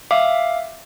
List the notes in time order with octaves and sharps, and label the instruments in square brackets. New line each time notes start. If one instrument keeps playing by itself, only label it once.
[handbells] E5 F5 D6